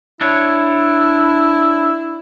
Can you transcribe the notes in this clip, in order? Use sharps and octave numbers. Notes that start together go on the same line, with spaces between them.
D4 E4 C#5